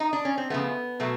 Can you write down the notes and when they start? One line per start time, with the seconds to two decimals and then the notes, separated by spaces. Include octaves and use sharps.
0.00 D#4
0.13 D4
0.25 C#4
0.38 C4
0.50 C#3 F3 A3 B3
1.00 B2 F#3 A3